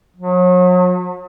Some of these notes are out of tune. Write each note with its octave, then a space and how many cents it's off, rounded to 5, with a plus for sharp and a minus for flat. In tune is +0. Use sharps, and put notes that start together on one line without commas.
F#3 -40